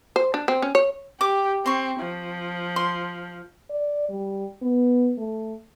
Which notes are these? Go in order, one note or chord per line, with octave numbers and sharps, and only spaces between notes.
C5
D4
C4
C#4
C#5
G4 D6
C4 C6 C#6
F3
C6
D5
G3
B3
A3